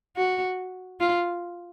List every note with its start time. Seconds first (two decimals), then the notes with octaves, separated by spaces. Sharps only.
0.17 F#4
1.00 F4